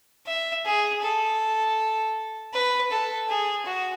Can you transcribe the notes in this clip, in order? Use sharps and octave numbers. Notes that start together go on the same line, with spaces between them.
E5
G#4
A4
B4
A4
G#4
F#4